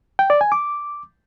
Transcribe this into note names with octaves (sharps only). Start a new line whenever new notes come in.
G5
D5
G#5
D6